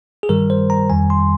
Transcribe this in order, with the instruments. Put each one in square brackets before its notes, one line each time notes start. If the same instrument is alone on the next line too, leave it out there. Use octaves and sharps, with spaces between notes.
[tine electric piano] G#4
G2 D#3 G3 A#4
C5
A#5
F2 D#3 G3 G#5
C6